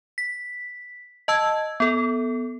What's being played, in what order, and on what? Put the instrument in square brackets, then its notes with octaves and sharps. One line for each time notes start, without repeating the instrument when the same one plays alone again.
[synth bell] B6
D#5 A5 E6 G#6
B3 A4